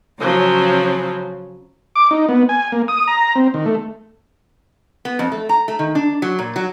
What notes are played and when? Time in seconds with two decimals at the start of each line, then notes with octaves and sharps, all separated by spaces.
0.20 C#3 F3 F#3 C#4
1.96 D6
2.11 D#4
2.29 B3
2.49 G#5
2.72 A#3
2.88 D#6
3.07 A#5
3.36 C4
3.54 D#3
3.66 A3
5.05 B3
5.19 F2
5.32 A3
5.49 A#5
5.68 A3
5.79 D#3
5.95 D4
6.22 F#3
6.39 A#2
6.56 F#3